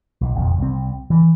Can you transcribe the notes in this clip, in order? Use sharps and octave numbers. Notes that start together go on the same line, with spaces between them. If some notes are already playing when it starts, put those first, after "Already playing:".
B1
F#1 B1 F2
C2 C4
E3